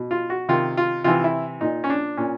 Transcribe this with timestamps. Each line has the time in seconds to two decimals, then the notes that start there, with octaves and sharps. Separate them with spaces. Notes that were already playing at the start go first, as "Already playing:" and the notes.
Already playing: B2
0.11 F4
0.30 F#4
0.49 C3 D#3 F4
0.77 F4
1.04 C3 E3 F4
1.24 E4
1.61 A#2 D#4
1.84 C#4
1.90 D4
2.17 A#2 C#4